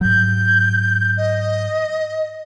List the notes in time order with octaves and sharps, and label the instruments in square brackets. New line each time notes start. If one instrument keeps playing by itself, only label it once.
[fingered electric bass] G#2 F#3 [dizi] G6
[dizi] D#5